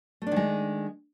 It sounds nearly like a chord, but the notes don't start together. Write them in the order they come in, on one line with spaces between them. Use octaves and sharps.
A3 D4 D#3 G#3